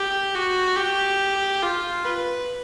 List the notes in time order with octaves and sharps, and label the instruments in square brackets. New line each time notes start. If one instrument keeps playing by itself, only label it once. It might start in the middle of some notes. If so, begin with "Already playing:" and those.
Already playing: [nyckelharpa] G4
F#4
G4
F4
B4